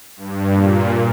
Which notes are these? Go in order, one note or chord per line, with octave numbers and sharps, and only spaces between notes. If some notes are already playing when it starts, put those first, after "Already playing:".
G2
A#2